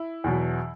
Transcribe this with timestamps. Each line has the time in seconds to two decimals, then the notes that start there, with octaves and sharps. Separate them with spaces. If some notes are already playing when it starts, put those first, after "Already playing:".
Already playing: E4
0.24 E2 B2 F#3